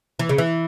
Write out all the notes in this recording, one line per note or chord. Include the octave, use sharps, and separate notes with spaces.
E3
C#3
E3